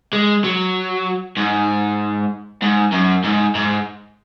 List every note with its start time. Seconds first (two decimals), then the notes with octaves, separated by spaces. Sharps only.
0.13 G#3
0.44 F#3
1.37 G#2
2.62 G#2
2.93 F#2
3.24 G#2
3.55 G#2